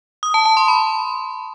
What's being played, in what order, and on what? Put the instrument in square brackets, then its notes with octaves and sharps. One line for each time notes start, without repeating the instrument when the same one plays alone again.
[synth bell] D#6
A5
A5
C6
B5